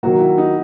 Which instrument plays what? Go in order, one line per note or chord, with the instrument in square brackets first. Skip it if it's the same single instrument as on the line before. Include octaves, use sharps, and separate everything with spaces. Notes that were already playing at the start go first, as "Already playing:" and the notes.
[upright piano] D#3 F#3 A#3 [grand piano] F#4
[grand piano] E4
D#4